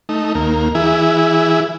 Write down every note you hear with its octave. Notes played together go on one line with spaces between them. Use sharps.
A3 D#4
D#2 A#3
E3 E4 G#4